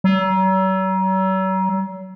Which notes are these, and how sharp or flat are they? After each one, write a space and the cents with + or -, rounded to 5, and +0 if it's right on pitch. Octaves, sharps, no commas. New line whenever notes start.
F#3 +40